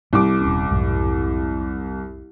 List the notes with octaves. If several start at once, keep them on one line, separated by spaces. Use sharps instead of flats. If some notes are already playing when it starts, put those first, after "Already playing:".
C2 G3 D6
D#1 C#4
B1 F2 G#2